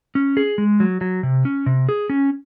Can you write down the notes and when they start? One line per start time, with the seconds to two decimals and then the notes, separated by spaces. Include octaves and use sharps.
0.15 C#4
0.37 G#4
0.58 G#3
0.80 F#3
1.01 F#3
1.23 C3
1.45 C#4
1.66 C3
1.89 G#4
2.10 C#4